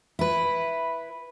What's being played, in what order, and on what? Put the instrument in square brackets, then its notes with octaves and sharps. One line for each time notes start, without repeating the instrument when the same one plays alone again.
[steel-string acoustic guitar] E4 B4